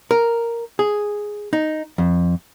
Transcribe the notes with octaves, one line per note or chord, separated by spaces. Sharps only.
A#4
G#4
D#4
F2